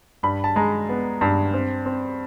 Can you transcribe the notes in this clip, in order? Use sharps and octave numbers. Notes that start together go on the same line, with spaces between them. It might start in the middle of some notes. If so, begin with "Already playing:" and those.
G2 B5
A5
G#3 A#5
B3
G2
C4
C4